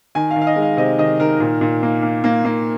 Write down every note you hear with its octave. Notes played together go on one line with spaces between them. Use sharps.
D#3 G#5
F5
D#3
F5
D#5
G#3
F5
C3 D#5
D#3 D#5
D#3 A#4
A#2 A#4
A#2
A#3
A#3
A#3
A#3